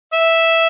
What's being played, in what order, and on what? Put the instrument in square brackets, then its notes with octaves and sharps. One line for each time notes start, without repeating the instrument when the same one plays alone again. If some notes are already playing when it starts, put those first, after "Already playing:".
[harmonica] E5